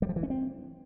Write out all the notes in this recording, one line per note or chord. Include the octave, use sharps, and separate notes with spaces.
G3
F3
E3
C#4
C4